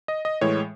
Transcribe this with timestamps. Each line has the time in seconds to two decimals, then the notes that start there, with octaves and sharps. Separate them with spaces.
0.08 D#5
0.25 D#5
0.41 A2 E3 G#3 C#5